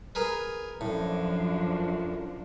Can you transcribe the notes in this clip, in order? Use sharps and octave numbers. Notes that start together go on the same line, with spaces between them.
G#4 A#4 B4
F#2 A2 F3 D4